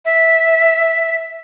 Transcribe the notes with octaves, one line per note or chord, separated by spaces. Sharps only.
E5